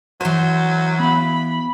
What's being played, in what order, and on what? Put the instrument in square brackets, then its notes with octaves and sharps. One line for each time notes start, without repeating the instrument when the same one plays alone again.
[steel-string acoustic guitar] E3 C5 [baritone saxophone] F#3
[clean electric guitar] B3 F5 [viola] B5